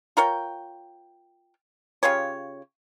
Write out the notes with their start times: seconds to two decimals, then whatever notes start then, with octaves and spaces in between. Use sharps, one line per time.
0.17 F4 A#4 C#5 G5
2.03 C#3 F4 G4 C#5